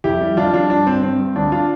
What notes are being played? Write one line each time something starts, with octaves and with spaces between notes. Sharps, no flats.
F2 E4 G4
G3
F2 D4 F4
G3 D4 F4
G2 D4
G2 C4
G2 C4
G2
D2 D4
D4 F4